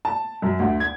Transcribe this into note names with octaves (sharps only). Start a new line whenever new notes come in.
A5
F#2
D2
G#6